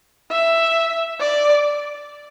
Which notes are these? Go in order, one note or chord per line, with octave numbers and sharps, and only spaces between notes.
E5
D5